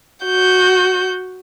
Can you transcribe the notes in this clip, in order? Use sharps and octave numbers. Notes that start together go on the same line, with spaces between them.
F#4 G6